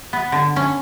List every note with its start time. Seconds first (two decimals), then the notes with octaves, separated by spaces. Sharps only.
0.13 B3
0.32 D3
0.56 C#4